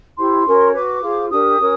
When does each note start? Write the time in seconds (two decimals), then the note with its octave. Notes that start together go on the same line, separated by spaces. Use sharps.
0.18 E4 G4 C5 C6
0.46 C#4 F#4 A#4 C#5
0.74 F#4 B4 D6
1.03 F4 G#4 C5
1.31 D4 G4 A#4 D#6
1.59 C#4 F#4 A#4 C#5